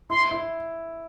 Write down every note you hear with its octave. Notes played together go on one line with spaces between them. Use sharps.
E4 C6
E4